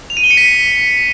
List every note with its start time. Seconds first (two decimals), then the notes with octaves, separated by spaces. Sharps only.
0.10 F7
0.17 D#7
0.24 G7
0.31 C#7
0.37 B6